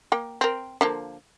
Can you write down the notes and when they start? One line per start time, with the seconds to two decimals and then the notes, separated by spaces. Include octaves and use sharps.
0.12 A#3 G5
0.41 C4 A#4
0.81 D3 F3 A#3